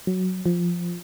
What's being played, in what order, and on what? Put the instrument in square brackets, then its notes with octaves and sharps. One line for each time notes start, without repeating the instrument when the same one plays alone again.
[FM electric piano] F#3
F3